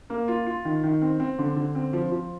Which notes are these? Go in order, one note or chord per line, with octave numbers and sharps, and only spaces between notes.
A#3
F4
F4
D#3
D#3
C4
C4
D3
D3
C4
F3
F3